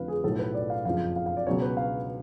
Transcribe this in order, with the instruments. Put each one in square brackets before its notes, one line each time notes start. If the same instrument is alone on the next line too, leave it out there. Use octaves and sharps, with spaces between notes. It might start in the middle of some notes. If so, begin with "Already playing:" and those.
Already playing: [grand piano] F1 F2 D3 F3 B4 F5
G#4
B1 A2 F3 A4
B4
D5
F5
F#1 F2 F3 F5
F5
F5
D5
C#2 B2 F#3 C#5
B4
F5